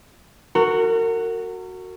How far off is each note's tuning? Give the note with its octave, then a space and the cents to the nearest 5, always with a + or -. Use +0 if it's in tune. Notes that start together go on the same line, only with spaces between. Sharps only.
F#4 +0 A#4 -35